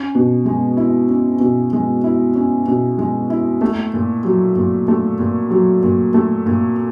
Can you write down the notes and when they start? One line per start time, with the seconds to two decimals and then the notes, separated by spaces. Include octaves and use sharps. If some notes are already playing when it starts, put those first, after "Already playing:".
Already playing: C#4
0.15 B2
0.45 G#3
0.77 E4
1.09 C#4
1.40 B2
1.73 G#3
2.04 E4
2.35 C#4
2.67 B2
2.98 G#3
3.30 E4
3.61 A3
3.94 A#2
4.24 F#3
4.56 A#2
4.88 A3
5.19 A#2
5.50 F#3
5.83 A#2
6.14 A3
6.46 A#2